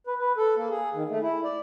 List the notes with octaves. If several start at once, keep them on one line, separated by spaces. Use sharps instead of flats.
B4
B4
A4
A#3
G#4
D#3
A3
E4
D5